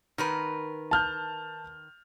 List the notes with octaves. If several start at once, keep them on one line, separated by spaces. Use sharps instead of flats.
D#3 A#4 B4
A5 F6 G6